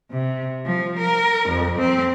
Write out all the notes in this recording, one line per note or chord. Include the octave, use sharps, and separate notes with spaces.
C3
F3
A#4
F2
C4